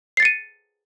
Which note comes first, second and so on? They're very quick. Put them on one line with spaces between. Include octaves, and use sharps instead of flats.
C7 A6 C#7 D#7